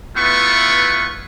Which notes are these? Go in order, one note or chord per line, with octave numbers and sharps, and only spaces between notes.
A3 B3 E4 F4 B4 C#6